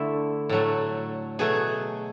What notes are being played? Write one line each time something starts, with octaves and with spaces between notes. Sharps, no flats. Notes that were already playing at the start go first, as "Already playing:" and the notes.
Already playing: D3 A3 E4
A2 F#3 A3
B2 F#3 A3 G#4